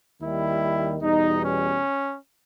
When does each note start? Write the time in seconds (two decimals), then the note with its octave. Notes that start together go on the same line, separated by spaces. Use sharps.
0.20 D#2 D#3 G3 E4
1.01 E2 B2 G3 D#4
1.43 C#4